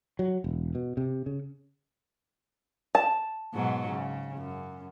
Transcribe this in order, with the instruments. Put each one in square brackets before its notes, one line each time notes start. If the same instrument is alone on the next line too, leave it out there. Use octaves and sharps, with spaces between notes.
[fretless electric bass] F#3
E1
B2
C3
C#3
[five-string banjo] A5
[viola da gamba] G#2 B2 F#3
C#3
F#2